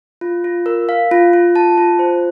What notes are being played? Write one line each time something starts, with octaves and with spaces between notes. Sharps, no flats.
F4
F4
A#4
F5
F4
F4
A5
F4
C5